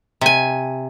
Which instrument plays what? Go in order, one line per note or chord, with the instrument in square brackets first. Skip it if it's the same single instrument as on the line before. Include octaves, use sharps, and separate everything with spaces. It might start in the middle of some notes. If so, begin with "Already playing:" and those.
[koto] C3 G#5